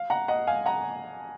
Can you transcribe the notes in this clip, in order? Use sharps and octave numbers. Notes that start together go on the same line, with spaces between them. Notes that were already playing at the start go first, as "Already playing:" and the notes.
Already playing: F5
F#5 A#5
D#5 F#5
F5 G#5
F#5 A#5